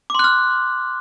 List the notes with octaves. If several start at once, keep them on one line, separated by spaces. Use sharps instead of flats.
C6 D6 F6 F#6